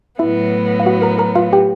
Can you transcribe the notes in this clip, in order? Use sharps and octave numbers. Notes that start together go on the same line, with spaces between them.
A2 F#3 B3 E4 E5
F5
F#4 F#5
A#4 A#5
A#4 A#5
F4 F5
G4 G5